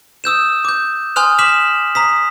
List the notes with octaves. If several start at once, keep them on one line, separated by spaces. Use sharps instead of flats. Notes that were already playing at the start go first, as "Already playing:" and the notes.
D#6 E6 G6 E7
D6 G6
G#5 C6 D#6 F6 F#6 F7
D6 F6 B6 E7 F#7
A#5 D#6 B6